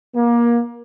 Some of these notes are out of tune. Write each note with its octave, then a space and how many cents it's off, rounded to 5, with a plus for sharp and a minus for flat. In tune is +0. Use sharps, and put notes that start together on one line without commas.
A#3 +25